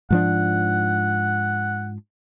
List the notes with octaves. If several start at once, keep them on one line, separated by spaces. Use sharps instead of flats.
G#2 F3 D4 F#5